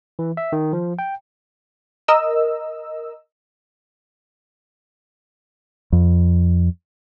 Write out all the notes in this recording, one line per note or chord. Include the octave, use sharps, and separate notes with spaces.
E3
E5
D#3
F3
G5
A#4 D#5 E6
F2